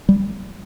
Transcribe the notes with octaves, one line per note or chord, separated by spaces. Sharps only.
G3